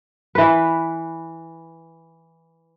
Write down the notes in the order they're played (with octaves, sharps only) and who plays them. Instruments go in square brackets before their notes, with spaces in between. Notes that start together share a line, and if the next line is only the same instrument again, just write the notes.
[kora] E3 B4